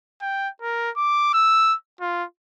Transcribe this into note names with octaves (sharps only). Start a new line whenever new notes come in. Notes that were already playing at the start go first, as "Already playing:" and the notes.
G5
A#4
D6
E6
F4